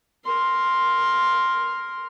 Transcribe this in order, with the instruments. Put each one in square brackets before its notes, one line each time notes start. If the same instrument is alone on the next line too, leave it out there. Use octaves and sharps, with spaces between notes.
[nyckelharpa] A#4 C6